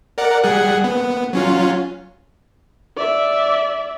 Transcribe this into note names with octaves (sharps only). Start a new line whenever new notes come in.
A#4 D5 F#5
G3 G#4 F#5
B3
F#3 C#4 F4
D5 E5